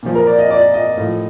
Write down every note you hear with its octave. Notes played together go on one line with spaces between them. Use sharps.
A#2 F3
A#4
D5
D#5
D5
D#5
A2 F3